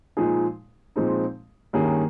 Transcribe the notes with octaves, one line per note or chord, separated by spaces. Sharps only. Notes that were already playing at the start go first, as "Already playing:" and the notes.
A#2 F3 G#3 D#4 G#4
A#2 F3 G#3 C4 D#4
G2 D#3 A#3 C#4 G#4